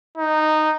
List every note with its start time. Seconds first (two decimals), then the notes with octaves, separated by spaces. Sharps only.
0.18 D#4